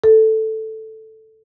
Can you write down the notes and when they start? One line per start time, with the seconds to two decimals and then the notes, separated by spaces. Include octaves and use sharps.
0.04 A4